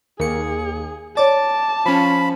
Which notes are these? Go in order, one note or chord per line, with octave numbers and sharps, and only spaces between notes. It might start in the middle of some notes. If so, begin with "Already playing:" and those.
D#2 G#4 A#4 C#7
C#5 D5 A5 D6 A6
F3 C#4 B5